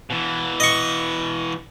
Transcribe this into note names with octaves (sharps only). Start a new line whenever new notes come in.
B2 E3
D#5 C#6